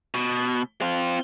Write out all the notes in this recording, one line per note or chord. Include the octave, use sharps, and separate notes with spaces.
B2
C4 F4